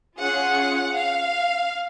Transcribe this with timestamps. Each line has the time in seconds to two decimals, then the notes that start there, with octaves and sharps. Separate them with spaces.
0.20 C#4 F4 G#4 F#5
0.96 F5